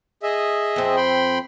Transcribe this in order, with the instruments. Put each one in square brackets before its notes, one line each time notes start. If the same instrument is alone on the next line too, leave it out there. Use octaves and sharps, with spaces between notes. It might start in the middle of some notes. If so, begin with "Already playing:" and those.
[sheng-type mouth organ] G#4 D#5 E5
[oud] F2 C4
[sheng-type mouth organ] G5 B5 C6